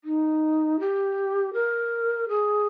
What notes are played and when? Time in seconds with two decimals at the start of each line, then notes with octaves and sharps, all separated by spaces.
0.04 D#4
0.79 G4
1.53 A#4
2.28 G#4